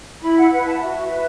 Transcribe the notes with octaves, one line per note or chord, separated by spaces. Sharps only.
E4 B5
F#5
B4 F#5
A5
F#4 E5
B4